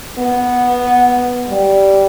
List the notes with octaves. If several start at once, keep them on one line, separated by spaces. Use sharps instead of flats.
B3
G3